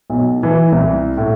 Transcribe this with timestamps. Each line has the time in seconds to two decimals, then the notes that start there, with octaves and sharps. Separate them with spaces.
0.10 B1
0.43 E3
0.72 C2
1.17 A2